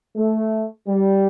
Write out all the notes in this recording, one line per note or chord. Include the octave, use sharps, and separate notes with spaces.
A3
G3